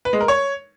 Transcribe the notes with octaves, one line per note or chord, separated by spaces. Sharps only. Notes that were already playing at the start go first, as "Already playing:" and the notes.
B4
G#3
A#4
C#5